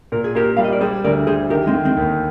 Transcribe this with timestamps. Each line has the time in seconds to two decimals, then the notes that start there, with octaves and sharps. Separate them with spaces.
0.12 A#2 A#4
0.24 G#4
0.35 A#3 G4 A#4
0.57 G3 F5
0.64 D#5
0.73 D5
0.81 G3 G#4 C5
1.04 D2 A#4 D5
1.27 D2 G#4 C5
1.50 D#3 G4 A#4
1.67 G#3 C4
1.74 D#3
1.85 G#3 C4
1.97 D#2